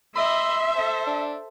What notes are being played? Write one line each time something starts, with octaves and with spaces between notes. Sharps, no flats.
D#5 E5 B5 C6
A4 C5
D4